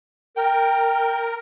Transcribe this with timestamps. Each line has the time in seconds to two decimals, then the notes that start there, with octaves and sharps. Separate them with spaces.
0.37 A#4 G5